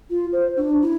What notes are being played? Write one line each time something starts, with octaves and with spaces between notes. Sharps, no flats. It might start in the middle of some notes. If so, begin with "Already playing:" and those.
F4
C5
D4
E4